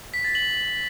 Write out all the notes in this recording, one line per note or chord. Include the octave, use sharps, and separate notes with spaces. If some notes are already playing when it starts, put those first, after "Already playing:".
B6
A6
F#7